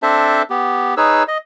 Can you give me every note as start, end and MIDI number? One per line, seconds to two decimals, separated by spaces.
0.03 0.42 60
0.03 0.42 62
0.03 0.42 69
0.03 0.42 72
0.03 0.42 76
0.03 0.42 81
0.50 0.94 59
0.50 0.94 67
0.97 1.23 63
0.97 1.23 68
0.97 1.23 71
0.97 1.23 73
0.97 1.23 88
1.28 1.38 75